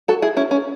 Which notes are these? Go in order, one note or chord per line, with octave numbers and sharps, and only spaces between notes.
F#4 A4
E4 G#4
C#4 E4
C#4